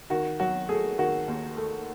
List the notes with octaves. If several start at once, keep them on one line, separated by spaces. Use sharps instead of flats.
D#3 F#4
F#3 F#4
A3 G#4
D#3 F#4
D#2
A3